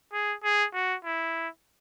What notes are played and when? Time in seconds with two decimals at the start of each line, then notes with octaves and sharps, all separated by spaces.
0.13 G#4
0.43 G#4
0.74 F#4
1.05 E4